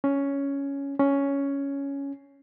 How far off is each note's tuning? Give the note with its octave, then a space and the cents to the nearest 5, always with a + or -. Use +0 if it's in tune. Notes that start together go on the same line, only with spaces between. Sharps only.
C#4 +5
C#4 +5